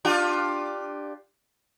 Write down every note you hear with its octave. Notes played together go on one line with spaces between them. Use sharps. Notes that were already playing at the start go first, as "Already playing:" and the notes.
D4 F4 G4